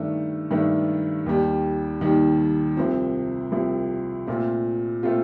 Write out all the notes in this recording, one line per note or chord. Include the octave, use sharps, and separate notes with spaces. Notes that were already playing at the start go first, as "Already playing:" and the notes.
Already playing: G2 D#3 A3 D4
G2 D#3 A3 D4
D#2 D#3 G3
D#2 D#3 G3
C2 C3 F3 C4
C2 C3 F3 C4
A#2 A3 C4 F4
A#2 A3 C4 F4